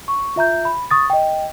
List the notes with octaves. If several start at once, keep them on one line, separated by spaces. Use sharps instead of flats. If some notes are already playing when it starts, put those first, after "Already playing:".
C#6
F4 E5 A#5 G6
B5
C#6 D#6 A6
D#5 G5